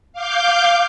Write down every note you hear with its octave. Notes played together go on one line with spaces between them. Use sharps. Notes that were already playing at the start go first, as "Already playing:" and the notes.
F5 D6 G6